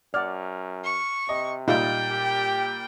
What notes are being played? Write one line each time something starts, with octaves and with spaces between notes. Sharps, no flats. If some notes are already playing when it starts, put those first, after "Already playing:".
F#2 D5 F#5 F6
C#6
C3 D#5
A#2 G3 D#4 F4 E5 G5
G4